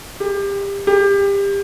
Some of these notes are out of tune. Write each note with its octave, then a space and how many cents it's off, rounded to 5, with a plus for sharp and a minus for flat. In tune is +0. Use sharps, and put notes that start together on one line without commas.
G4 +25
G4 +25